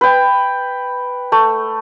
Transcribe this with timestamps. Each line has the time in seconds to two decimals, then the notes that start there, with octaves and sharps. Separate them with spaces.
0.01 B4 G5
1.32 A3